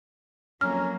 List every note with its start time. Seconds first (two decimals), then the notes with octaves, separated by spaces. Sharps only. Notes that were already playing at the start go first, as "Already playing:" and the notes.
0.61 F2 D3 F#3 A#3 C#4 A#5 F6